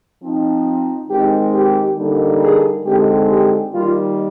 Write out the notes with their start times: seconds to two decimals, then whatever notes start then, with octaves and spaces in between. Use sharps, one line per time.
0.22 F3 C4 D#4
1.09 D#3 G#3 C4 D#4 G4
1.53 G4
1.97 D3 G3 A#3 D#4
2.41 G#4
2.84 D3 G#3 C4 D#4 G4
3.28 G4
3.72 D#3 G3 A#3 F4